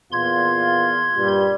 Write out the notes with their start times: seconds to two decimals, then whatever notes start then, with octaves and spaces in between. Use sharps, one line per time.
0.12 E2 A#2 F4 C6 G#6
1.16 G2 A#2 G3